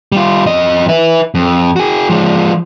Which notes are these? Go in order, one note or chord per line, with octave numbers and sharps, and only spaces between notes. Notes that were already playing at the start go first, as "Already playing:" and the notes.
G3 F4
F2 D#5
B4 E5
F2
F#4 G#4
F3 G#3